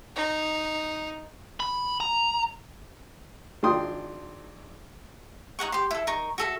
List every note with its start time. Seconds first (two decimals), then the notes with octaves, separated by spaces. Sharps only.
0.16 D#4
1.60 B5
2.00 A#5
3.63 G#1 D4 F4 G5 C6 D#6
5.59 D#4 A#4 F#5 C#6
5.72 G4 C6
5.91 E4 A4
6.07 D#4 A#4 C#6
6.38 F#4 A4 E5